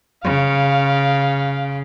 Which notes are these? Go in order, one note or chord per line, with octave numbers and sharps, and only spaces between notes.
C#3 F5